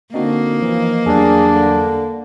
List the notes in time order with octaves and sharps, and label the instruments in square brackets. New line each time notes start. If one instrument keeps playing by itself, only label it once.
[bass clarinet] D3 [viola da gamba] A#3 [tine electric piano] C4 D4 F#4 [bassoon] D#4
[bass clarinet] E3 [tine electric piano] F3
[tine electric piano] E2 F#3 G3 [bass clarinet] D4 [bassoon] G#4
[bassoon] D3